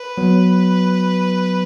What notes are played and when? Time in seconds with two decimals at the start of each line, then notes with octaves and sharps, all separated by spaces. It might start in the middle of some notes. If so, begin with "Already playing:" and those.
Already playing: B4
0.18 F#3 B3